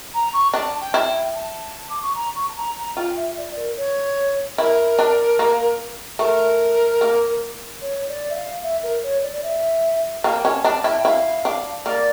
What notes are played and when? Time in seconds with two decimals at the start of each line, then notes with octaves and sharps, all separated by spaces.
0.14 A#5
0.33 C#6
0.53 D4 A5
0.81 G5
0.94 E4
1.07 G5
1.35 A5
1.89 D6
2.02 C#6
2.15 A#5
2.35 C#6
2.48 A5
2.56 A#5
2.77 A#5
2.96 F4 G5
3.17 E5
3.37 D5
3.56 A#4
3.77 C#5
4.58 E4 A#4
4.99 D4
5.39 A#3
6.19 A3 A#4
7.01 A#3
7.81 C#5
8.08 D5
8.30 E5
8.35 F5
8.63 E5
8.83 A#4
9.03 C#5
9.23 D5
9.34 D5
9.43 E5
10.24 A#3 G5
10.44 C#4 A5
10.64 D4 A5
10.84 E4 G5
11.05 E4 F5
11.45 D4
11.86 A#3 D5